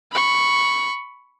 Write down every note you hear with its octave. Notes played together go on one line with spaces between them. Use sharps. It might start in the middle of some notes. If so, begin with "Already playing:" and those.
B5 C#6